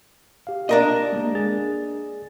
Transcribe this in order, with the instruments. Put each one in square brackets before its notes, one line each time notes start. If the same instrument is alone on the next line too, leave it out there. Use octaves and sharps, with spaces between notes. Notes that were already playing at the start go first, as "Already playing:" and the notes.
[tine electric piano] G4 F5
[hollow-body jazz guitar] D4 A#4 D#5
[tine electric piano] G#3 A#3
G#4 A6